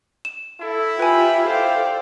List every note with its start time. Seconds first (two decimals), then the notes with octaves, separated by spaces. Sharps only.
0.25 E7
0.61 E4 A4
1.00 F4 G4 B4 G5 G#5 B5
1.47 A4 C5 D5 F5 G5